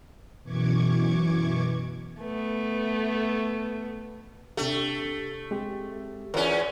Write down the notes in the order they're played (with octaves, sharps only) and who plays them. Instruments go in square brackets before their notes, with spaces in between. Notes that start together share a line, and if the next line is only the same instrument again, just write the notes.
[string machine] F#2 B2 E3 C#6 D6 G#6
[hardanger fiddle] A3 B3
[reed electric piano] C3 D4 G4 [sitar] A3
[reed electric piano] G#3 C4 G4
[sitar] E2 C#4 [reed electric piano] F4 A#4